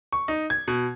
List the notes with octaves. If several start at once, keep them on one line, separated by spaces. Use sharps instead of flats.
C#6
D#4
G#6
B2